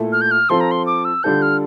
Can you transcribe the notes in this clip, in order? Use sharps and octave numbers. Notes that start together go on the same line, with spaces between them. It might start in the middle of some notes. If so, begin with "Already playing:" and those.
Already playing: A#2 A3 E4 A4
F6
G6
F6
F3 C4 F4 A4 C6
A#5
C6
D6
E6
D3 G3 D4 F4 A4 G6
F6